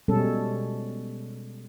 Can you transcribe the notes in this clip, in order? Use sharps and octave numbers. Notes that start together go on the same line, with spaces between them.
B2 G3 G#3 C#4 A4